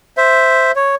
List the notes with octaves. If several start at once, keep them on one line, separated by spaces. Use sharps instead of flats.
C5 E5
C#5